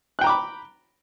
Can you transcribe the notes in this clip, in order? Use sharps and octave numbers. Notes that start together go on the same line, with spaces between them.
G5 A#5 B5 D6 F#6